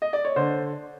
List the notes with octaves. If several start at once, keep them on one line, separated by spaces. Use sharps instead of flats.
D#5
D5
C#5
D3 C5